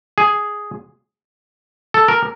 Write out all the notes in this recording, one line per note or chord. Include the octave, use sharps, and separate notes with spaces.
G#4
A4
A#4